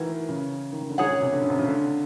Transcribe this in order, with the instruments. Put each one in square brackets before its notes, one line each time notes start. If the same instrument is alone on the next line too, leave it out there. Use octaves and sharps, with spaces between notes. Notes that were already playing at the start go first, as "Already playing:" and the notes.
Already playing: [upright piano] D#3 E3 [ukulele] F#4 A#4
[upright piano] C#3
D#3
C#3
D3
[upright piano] D#3 [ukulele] G#4 C#5 F#5
[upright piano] C#3
C3
D3
C#3
C3
C#3
D3